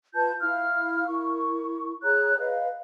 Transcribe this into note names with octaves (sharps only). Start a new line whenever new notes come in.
F4 B4 A5 G6
E4 F5 F6
E4 A#4 C#6
G#4 C#5 A#5 F#6
B4 D#5 F5